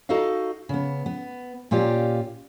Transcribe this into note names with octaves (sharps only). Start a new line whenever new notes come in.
D#4 F#4 A4 D#5 F5
C#3 B3
B3
A#2 C#4 F4 G4 D5